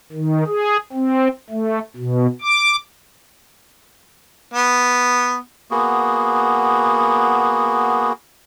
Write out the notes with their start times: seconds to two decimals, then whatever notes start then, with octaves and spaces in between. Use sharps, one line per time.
0.12 D#3
0.47 G#4
0.92 C4
1.50 A3
1.97 B2
2.41 D6
4.54 B3
5.71 A#3 B3 F#4 G#4